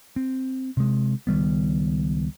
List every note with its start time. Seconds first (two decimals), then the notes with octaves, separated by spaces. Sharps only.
0.16 C4
0.77 C3 G#3
1.27 C#2 D#3 G3 B3